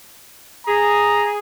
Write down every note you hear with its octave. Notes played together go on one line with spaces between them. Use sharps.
G#4 A#5